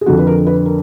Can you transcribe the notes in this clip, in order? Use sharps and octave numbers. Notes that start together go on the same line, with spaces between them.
G#4
F2 D3 F3 F#4
B4
A#4
B4
A#4